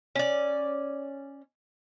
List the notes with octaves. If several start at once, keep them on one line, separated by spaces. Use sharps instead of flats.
C#4 D5